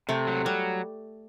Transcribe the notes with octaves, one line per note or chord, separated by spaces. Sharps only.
C3 A3
F#3
F#3 G3